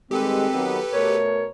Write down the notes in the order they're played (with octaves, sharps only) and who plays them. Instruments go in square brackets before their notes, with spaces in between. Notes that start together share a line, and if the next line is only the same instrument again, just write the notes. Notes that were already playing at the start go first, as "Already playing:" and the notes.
[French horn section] D#3 G3 G#3 [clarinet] C4 [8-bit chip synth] G4 A4 B4
[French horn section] D#3 F#3 B3
[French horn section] B2 A3 A#4 [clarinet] C#5